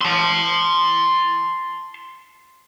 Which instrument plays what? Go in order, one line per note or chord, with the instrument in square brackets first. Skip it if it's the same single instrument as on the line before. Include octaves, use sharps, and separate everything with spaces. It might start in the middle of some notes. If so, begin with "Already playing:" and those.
[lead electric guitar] A5 C6